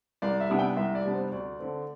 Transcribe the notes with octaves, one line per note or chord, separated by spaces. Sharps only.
C2 D5
E5
C3 G3 B3 D4
G5
C2 E5
D5
C3 G3 B3 D4
C5
D2 D5
D3 A3 C4